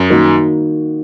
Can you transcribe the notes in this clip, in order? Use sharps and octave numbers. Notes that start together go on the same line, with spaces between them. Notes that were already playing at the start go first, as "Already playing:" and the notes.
Already playing: F#2
D#3 A#3 D#4 F#4